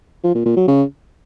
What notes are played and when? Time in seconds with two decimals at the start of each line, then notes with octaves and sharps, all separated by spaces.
0.24 F3
0.35 A#2
0.46 A#2
0.56 F#3
0.67 C#3